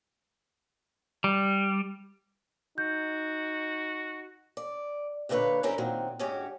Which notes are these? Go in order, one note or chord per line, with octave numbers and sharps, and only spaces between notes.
G3
D#4 F#4 G6
D5
D#2 A#2 D3 D#4 B4 C#5
G3 C4 C#4 E4 A#4 C#5
A#2 D#3 F#3 C4
D2 G#2 C#4 F#4 G4